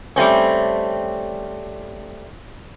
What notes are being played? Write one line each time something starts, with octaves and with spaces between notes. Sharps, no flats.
G3 A3 C4 C#4